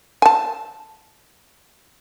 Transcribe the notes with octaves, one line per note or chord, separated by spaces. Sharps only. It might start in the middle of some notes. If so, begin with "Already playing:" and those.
G#5 A5